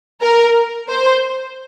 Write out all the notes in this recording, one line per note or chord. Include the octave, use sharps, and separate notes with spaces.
A#4
C5